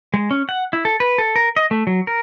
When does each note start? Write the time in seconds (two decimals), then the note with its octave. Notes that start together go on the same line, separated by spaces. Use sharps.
0.14 G#3
0.31 C#4
0.49 F#5
0.73 E4
0.85 A4
1.00 B4
1.18 A4
1.36 A#4
1.57 D#5
1.71 A3
1.87 F#3
2.07 A#4